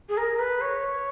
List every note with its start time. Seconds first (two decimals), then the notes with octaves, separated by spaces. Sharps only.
0.09 G#4
0.17 A#4
0.38 B4
0.61 C#5